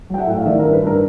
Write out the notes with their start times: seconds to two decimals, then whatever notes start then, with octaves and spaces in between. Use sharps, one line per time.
0.10 F#3 G5
0.18 E5 F#5
0.27 A2
0.39 F5
0.46 D#3 D5 E5
0.59 A#4
0.64 G2
0.73 B4
0.82 G2 A#4